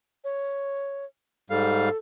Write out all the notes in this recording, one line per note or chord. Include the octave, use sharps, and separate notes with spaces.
C#5
G#2 G3 A4 F5